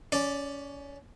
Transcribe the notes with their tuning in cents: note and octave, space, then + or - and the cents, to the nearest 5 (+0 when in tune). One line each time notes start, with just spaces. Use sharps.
C#4 +20 D5 +0